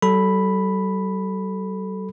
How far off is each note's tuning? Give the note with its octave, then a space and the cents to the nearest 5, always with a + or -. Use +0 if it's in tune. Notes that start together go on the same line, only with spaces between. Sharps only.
G3 -45 A4 +0 B5 +0